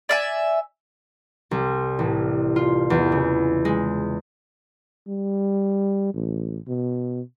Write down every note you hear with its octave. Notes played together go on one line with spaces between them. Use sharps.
D5 E5 G#5
C2
A1
F4
E2
C#3
G#3
G3
A1
B2